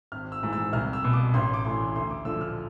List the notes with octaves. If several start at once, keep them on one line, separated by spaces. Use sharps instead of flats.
G#1 F6
E6
G#2 E3
E6
C2 F6
E6
B2
D6
A1 C6
D6
A2 E3 C6
D2 C6
D6
D3 F3 E6
F6